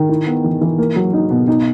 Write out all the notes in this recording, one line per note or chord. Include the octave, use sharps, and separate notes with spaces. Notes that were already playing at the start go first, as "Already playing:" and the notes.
Already playing: D#3
E4
B3
E3
E3
A#3
F#3
D#4
B2
D#4